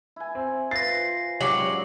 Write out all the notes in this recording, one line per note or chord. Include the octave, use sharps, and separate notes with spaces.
E4 G#5
C4
F4 B4 C5 A6 A#6 C7
G#2 F#3 G3 C#4 G4 D6 F#7